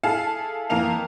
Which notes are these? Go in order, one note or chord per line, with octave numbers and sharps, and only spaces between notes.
E4 G#4 A4 F5 A5
F2 E3 A#3 A#4 F5 F7